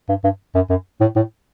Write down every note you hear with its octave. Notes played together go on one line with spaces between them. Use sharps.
G2
G2
F#2
F#2
A2
A2